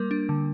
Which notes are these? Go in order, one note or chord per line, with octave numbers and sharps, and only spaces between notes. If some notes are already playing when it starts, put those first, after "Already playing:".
Already playing: G3 A#3 A#4
D4
D3